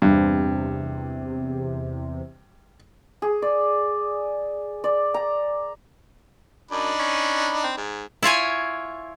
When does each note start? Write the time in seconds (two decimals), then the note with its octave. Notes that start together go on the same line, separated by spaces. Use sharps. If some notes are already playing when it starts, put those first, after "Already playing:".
0.02 E2 G2 C3
3.22 G#4
3.42 D5
4.84 D5
5.14 A#5
6.71 F#2 D4 D#4 B5
6.99 C#4
7.64 C4
7.77 G#2
8.23 E4 F4 C#5 G#5